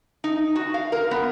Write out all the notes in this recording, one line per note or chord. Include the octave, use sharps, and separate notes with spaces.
D#4
F#4
F5
A#4
B3